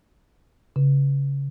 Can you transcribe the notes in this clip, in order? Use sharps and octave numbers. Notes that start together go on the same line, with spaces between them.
C#3